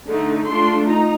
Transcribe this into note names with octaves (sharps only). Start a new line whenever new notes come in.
D3 A3 D#4
A3 D4 F4 C6
D#4 A#5